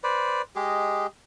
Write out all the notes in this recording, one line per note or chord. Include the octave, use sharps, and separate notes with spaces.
B4 C5 D5
G#3 G4 G#4 D#5